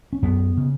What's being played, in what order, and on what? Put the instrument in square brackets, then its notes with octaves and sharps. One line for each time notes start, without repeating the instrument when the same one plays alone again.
[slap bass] C#4
F#2 B3
C#3